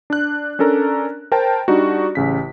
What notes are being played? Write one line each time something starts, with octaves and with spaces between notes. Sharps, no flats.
D4 F#6
C#4 D4 A4 A#4 A#5
A#4 C5 G5 A5
G3 D4 D#4 F#4
A1 C#3 B6